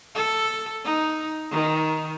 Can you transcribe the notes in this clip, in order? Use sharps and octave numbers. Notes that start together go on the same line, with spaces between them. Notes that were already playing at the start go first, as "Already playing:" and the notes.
A4
D#4
D#3